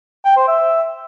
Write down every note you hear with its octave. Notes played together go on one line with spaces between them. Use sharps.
G5
C5
E5